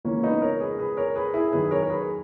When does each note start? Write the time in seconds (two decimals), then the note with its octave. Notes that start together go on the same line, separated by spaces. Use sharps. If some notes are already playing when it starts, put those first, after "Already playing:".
0.05 C#2 C#3 E3 A#3 C#4
0.23 B3 D#4
0.42 A#4 C#5
0.60 G#4 B4
0.79 G#4 B4
0.97 A#4 C#5
1.16 G#4 B4
1.34 E4 G#4
1.52 F#2 D#3 G#4 B4
1.71 A#4 C#5
1.82 A#4
1.90 G#4 B4